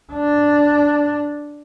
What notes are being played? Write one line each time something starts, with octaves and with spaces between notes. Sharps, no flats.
D4